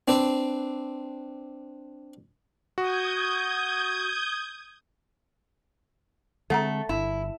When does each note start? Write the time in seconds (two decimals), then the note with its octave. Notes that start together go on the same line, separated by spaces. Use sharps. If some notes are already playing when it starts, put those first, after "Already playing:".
0.08 C4 D4 B4
2.78 F#4 D#6 G6 G#6
6.50 D3 G#3 A3 C4 A4 F#5 A#5
6.89 G1 E4